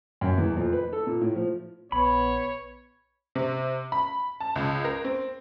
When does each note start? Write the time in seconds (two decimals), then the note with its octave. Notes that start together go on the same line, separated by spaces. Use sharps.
0.21 F#2
0.37 E2
0.57 F2
0.73 B4
0.93 A4
1.07 A#2
1.21 A2
1.36 F3
1.92 A#1 B3 C#5 B5
3.35 C3
3.92 B5
4.40 A5
4.56 C#2
4.85 A#4
5.05 C4